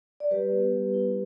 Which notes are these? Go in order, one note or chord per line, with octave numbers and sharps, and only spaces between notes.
D5
G3 G4 B4
B3
G3
E4